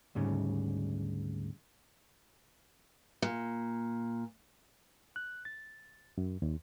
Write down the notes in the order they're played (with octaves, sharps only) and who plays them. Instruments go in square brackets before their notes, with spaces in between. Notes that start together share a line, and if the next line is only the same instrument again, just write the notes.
[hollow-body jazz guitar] D2 G#2 C#3 G3
[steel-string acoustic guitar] A#2
[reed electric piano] F#6
A6
F#2
D#2